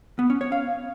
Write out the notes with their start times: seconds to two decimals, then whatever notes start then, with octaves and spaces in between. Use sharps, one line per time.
0.19 B3
0.30 C#4
0.41 C#5
0.52 F5